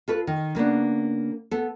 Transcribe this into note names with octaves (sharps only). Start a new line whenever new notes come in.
F4 A4 B4
D#3
C#3 A#3 B3 D4
B3 A4